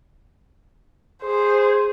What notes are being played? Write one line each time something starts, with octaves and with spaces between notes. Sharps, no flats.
G#4 C5